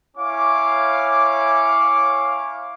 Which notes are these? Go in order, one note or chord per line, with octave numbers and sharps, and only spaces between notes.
C#4 E4 C#5 F5 D6